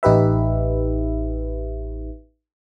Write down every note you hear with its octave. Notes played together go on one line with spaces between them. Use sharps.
A1 D#4 G4 B4 E5